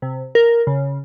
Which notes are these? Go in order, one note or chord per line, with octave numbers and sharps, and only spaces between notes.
C3
A#4
C#3